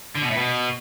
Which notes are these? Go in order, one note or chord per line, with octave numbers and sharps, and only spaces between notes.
D3
B2
A2
B2